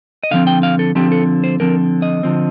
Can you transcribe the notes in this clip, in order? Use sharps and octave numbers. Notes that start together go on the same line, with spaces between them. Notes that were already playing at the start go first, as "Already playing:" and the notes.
D#5
D3 F3 C4 F5
G5
F5
A4
D3 F3 C4 G4
A4
C5
D3 F3 C4 A#4
D#5
D3 F3 C4